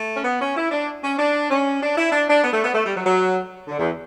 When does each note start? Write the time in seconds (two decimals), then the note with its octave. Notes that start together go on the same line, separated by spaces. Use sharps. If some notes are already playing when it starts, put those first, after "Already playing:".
Already playing: A3
0.16 C#4
0.24 B3
0.41 C#4
0.56 E4
0.71 D4
1.03 C#4
1.18 D4
1.50 C#4
1.81 D4
1.97 E4
2.12 D4
2.28 D4
2.44 B3
2.53 A3
2.64 B3
2.74 A3
2.85 G3
2.95 F#3
3.06 F#3
3.68 D3
3.78 E2